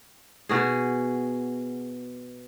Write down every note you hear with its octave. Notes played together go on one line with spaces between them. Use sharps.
B2 F#4 G#4